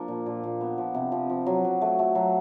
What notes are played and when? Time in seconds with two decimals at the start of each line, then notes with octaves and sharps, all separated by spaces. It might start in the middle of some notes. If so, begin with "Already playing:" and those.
Already playing: F3 A#3 D4
0.08 A#2
0.26 A#2
0.44 A#2
0.61 B3
0.78 F3
0.94 C3
1.12 F3
1.29 F3
1.46 F#3
1.64 F#3
1.82 A3
1.99 A3
2.15 F#3